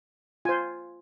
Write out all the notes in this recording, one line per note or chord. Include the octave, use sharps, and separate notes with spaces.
F4 C5 G#5